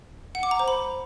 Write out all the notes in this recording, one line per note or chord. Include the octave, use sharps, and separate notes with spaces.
F#5
D6
A#5
C5
B5